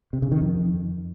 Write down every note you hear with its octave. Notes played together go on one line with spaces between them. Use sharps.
C3
C#3
D#3
F2